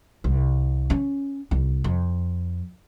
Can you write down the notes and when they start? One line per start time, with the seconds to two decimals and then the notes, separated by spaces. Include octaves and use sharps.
0.24 C2
0.90 C#4
1.51 C2
1.84 F2